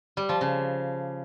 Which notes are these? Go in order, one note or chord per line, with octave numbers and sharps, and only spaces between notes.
G3
F3
C#3